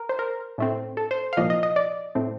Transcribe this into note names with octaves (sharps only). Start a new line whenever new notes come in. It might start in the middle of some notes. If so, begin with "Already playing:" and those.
Already playing: A#4
C5
A#4
A2 A3 C4
A4
C5
F5
C2 A#2 F3 A#3 D#5
D#5
D#5
D5
A2 A3 C4